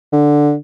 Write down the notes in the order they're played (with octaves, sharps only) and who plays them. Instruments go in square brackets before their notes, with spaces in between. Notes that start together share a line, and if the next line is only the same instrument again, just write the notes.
[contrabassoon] D3